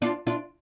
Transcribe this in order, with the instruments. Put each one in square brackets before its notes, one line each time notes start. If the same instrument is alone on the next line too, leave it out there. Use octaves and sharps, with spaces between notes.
[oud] D4 F4
D4 F4